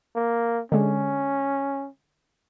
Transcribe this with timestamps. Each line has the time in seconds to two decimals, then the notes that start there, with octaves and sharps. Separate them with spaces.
0.16 A#3
0.72 D3 G#3 C#4